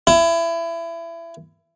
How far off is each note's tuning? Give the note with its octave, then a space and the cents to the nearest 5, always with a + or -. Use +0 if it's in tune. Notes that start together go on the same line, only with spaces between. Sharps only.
E4 +25